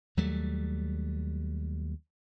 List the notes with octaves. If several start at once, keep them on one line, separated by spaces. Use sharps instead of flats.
D#2 F#3 G3 A3